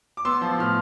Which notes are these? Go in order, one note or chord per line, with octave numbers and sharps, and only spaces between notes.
D6
B3 C6 E6
F3
A2 F6